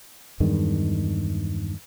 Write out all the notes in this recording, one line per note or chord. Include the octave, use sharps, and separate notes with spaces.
E2 G2 D#3 G#3